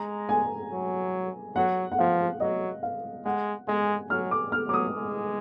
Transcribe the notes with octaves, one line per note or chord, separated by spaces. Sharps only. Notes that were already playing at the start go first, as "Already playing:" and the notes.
Already playing: G#3 A#5
G#5
F#3
F#3 F#5
F#5
F3 F5
F#3 D#5
F5
G#3 F#5
G#3 G#5
F#3 F6
D6
F6
F#3 D6
D#6
G#3